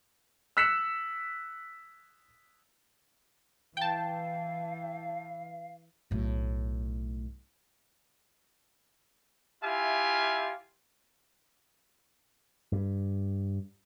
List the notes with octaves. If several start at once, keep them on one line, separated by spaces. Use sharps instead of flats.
E6 F#6 B6 C#7 E7
E3 F5 G5 A5
B1 A2
E4 F4 G4 E5 F5 G#5
G2